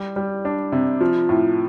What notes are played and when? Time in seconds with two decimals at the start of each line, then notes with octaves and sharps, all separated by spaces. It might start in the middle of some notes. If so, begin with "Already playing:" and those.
Already playing: G3
0.16 G3
0.45 D4
0.72 C3
1.01 F3
1.29 A2